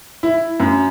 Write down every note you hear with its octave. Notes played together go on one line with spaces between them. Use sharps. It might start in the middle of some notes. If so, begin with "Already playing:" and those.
E4
F#2